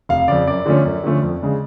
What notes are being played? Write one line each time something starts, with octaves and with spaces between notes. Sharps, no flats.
F1 F5
F2 C#3 D5
F#2 D5
D3 F3 A3 C#4
F#2
D3 F3 A3 C#4
F2
C#3 G#3 D4